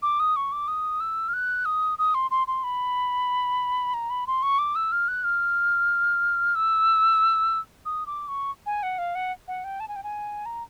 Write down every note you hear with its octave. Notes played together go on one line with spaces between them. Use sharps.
D6
D#6
C#6
D6
D#6
E6
F6
F#6
D#6
D#6
C6
C6
C6
B5
A#5
B5
C6
C#6
D6
E6
F6
F#6
F6
E6
D#6
D6
C#6
G#5
F#5
F5
F#5
F#5
G5
A5
G#5
G5
G#5
A#5